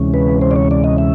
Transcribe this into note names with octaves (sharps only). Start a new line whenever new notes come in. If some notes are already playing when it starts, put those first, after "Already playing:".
Already playing: D2 C3 E3 G#3 C#4
B4
C5
D5
C#5
D5
D#5
E5